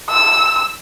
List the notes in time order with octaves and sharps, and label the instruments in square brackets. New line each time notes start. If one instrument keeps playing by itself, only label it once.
[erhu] E6